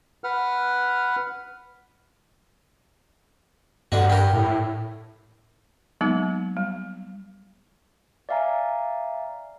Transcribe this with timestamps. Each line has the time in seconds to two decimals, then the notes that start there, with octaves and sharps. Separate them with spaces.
0.24 B4 F#5 F6
3.92 G2 D3 D4 F#4
4.10 G4 A#4
4.33 A2
6.01 F#3 G#3 A#3 B3 D#4
6.57 G3
8.29 D5 E5 F5 G#5 A#5